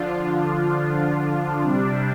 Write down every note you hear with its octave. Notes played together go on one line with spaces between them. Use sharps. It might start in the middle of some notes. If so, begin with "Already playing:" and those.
Already playing: D3 F3 D4 F4
C3 G3 D4